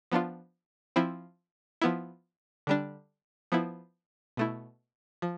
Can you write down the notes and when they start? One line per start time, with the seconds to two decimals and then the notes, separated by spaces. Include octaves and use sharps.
0.12 F3 B3 D4 F4
0.96 F3 C4 E4
1.82 F3 B3 E4
2.67 D3 G3 D4
3.52 F3 B3 E4
4.37 B2 A3 E4
5.22 F3